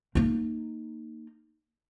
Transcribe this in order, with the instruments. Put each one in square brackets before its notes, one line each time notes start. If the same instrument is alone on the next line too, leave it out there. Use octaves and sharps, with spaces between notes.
[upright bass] A#3 D#4